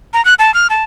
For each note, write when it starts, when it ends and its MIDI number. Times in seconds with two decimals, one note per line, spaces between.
0.13 0.23 82
0.25 0.34 90
0.39 0.54 81
0.54 0.67 89
0.70 0.84 81